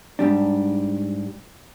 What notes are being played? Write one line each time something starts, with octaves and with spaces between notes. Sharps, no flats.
G#2 G3 D4